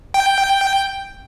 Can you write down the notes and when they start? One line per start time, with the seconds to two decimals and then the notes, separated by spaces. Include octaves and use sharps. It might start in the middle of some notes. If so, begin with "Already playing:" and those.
0.14 G5